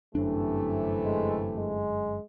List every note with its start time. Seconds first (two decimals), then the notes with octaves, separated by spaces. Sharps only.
0.15 G1 F#2 C3 E3 A3 D4
1.04 G#3
1.57 G#3